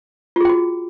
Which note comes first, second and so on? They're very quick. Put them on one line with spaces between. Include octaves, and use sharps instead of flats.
F4 G#4 G5 F#4